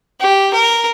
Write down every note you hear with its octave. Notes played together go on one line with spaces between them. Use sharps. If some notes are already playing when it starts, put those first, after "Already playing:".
G4
A#4